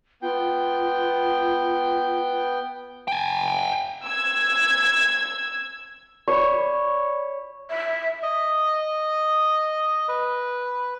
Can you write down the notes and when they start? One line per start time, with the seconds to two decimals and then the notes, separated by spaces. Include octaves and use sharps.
0.22 B3 F4 G5
3.08 G5 G#5
4.05 E6 G#6
6.28 C#5 D5 B5
7.70 E5
8.23 D#5
10.08 B4